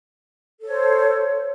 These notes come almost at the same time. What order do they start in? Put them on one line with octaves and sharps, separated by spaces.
A4 C#5 C5